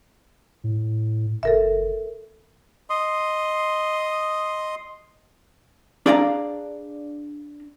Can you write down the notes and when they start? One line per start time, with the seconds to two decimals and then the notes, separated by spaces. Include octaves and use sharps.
0.64 A2
1.43 F#1 A4 A#4 E5
2.90 D#5 C6 D#6
6.06 D4 G#4 D5 F5 G5 A#5